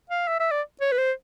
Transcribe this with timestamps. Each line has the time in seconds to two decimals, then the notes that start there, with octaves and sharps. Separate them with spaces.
0.10 F5
0.28 E5
0.40 E5
0.51 D5
0.81 C#5
0.92 B4
0.98 C5